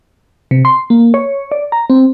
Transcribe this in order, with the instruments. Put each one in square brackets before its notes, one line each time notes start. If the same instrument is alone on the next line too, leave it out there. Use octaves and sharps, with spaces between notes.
[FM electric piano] C3
C6
A#3
C#5
D5
A#5
C4